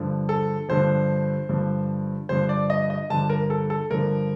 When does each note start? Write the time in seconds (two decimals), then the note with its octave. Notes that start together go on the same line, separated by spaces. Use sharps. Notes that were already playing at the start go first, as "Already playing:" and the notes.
Already playing: G2 D3 F3
0.29 A4
0.69 G2 D3 F3 C5
1.49 G2 D3 F3
2.29 G2 D3 F3 C5
2.49 D5
2.70 D#5
2.90 D#5
3.10 G2 D3 F3 A5
3.30 A#4
3.50 A4
3.70 A4
3.90 G2 D3 F3 A#4